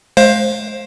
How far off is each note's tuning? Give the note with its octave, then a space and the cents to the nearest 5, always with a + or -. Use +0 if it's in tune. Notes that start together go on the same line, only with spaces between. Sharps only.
G#3 +40 C5 +20 F5 +0